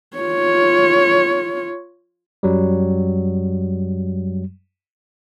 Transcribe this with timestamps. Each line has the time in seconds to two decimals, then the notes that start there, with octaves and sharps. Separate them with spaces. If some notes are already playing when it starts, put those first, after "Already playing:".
0.17 F4 C#5
2.43 F#2 F#3 G3